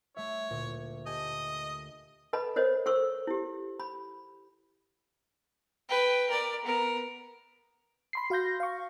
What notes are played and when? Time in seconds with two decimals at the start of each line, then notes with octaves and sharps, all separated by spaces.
0.16 A3 C#5 E5
0.50 D2 A#2
1.06 G4 D#5 G#5 A5
2.33 A4 B4 D#5 A5 B5
2.56 A#4 C5 C#5 D#5
2.86 A4 C5 C#6 E6
3.27 E4 G4
3.80 B5
5.89 B4 G5
6.29 A#4 D5
6.65 B3 A#4
8.13 B5 C6 C7
8.30 F#4 F5 C6 G6 A#6
8.60 F5 C#6